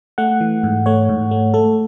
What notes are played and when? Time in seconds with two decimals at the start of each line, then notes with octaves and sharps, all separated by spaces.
0.18 A3 F#5
0.41 E3
0.63 G#2
0.86 A3 C#5
1.09 G#2
1.31 A3
1.54 A3 A4